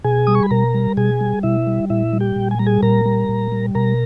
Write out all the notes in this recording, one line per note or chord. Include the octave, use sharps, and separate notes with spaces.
B2 G#4 G#5
G3 D#6
C#6
B5
B2 A#4 A#5
G3
B2 G#4 G#5
G3
B2 E4 E5
G3
A#2 E4 E5
G3
G4 G5
A#2
G#5
G3 A#5
G#4 G#5
A#2 A#4 A#5
G3
A#2
G3
B2 A#4 A#5